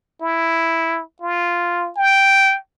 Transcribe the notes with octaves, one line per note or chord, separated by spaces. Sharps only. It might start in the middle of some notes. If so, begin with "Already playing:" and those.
E4
F4
G5